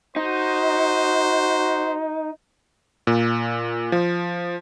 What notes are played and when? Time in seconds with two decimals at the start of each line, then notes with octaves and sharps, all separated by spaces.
0.16 D#4 F#4 C5
3.07 A#2
3.92 F3